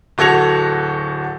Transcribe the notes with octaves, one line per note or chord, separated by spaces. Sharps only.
D1 F#4 A4 G#6 A#6 F7